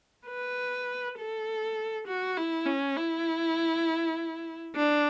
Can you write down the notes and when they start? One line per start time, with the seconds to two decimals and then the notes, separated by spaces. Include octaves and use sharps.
0.28 B4
1.18 A4
2.08 F#4
2.37 E4
2.66 C#4
2.96 E4
4.76 D4